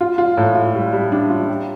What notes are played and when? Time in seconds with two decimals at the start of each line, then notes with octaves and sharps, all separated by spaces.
0.01 F4
0.18 F4
0.37 A2
0.55 F4
0.75 G3
0.93 G3
1.12 D4
1.29 F4
1.48 G4